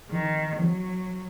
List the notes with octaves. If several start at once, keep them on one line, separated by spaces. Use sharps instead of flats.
D#3
F#3